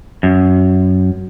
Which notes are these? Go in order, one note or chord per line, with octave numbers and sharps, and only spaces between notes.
F#2